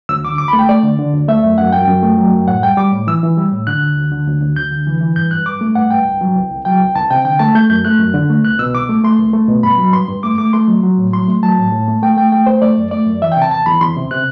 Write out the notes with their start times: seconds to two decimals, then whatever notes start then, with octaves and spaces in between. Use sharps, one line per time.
0.09 D2 E6
0.25 D3 D6
0.38 D2 D6
0.48 A3 B5
0.59 G5
0.69 A3 D5
0.83 D3
0.99 D3
1.13 D2
1.28 A3 E5
1.43 F#2
1.58 F#2 F#5
1.72 F#2 G5
1.88 F#2
2.03 A3
2.18 F#3
2.32 F#2
2.48 A2 F#5
2.63 G3 G5
2.77 G3 D6
2.92 A2
3.07 E3 E6
3.23 E3
3.37 G3
3.52 A2
3.67 D3 F#6
3.82 D2
3.97 D2
4.12 D3
4.27 D2
4.41 D2
4.56 D2 G6
4.71 D3
4.87 E3
5.01 E3
5.16 G2 G6
5.31 G2 F#6
5.46 G2 D6
5.61 A3
5.75 G2 F#5
5.90 G2 G5
6.05 C2
6.21 F#3
6.36 C2
6.51 C2
6.65 F#3 G5
6.80 C2
6.96 C2 A5
7.10 C3 G5
7.25 D3 G5
7.39 A3 A5
7.55 A3 G6
7.70 F#2 G6
7.85 A3 F#6
7.99 F#2
8.14 D3
8.30 A3
8.44 C2 F#6
8.59 B2 E6
8.74 C2 D6
8.89 A3
9.04 A3 C6
9.19 C2
9.33 A3
9.49 B2
9.63 G2 B5
9.78 F#3
9.93 G2 C6
10.08 G2
10.23 A3 D6
10.38 A3 D6
10.53 A3 C6
10.68 F#3
10.83 F#3
10.97 A2
11.13 F#3 C6
11.28 A3
11.43 F#3 A5
11.58 A2
11.72 A2
11.88 A3
12.02 A3 G5
12.17 A3 G5
12.32 A3 G5
12.46 A3 C5
12.62 A3 D5
12.77 F#2
12.91 A3 D5
13.07 F#2
13.22 E3 E5
13.32 G5
13.37 C3 A5
13.51 E2 A5
13.66 E2 B5
13.81 E2 C6
13.97 C3
14.11 C3 F#6